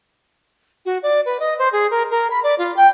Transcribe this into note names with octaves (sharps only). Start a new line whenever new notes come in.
F#4
D5
B4
D#5
C5
G#4
A#4
A#4
B5
D5
F4
G5